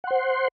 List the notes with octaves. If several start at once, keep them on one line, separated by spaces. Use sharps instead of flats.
C5 F#5 C6